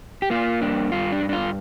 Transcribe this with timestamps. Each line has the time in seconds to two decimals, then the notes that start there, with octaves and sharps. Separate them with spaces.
0.22 G4
0.30 A#3 F4
0.61 G2 D4
0.92 G2 F4
1.12 D4
1.22 G2
1.29 D4
1.33 F4